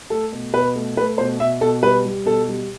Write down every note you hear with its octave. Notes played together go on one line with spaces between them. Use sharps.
A3 A4
B2
B2 B4
A3
A3 B4
B2 C5
B2 E5
B2 A4
G3 B4
G3
B2 A4
G3